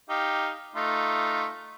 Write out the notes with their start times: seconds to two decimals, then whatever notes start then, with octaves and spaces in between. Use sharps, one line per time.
0.09 D#4 G4 F5
0.75 A3 D#4 F4